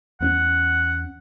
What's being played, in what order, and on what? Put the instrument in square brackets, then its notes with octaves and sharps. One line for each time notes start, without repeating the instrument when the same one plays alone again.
[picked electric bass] E2 B3 C#4 [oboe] F#5